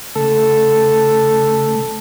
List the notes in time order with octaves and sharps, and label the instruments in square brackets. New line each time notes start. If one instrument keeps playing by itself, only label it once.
[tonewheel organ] C#3 A3 [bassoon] A4